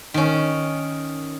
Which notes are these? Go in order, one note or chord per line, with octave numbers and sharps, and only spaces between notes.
D#3 C#4